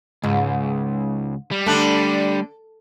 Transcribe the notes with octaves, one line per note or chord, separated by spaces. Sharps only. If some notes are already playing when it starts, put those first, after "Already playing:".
C#2 G#2 G#3
G3
D3 A3 D4 A4